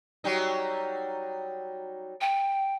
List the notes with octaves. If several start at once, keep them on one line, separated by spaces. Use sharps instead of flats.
F#3 G3 D#4
G5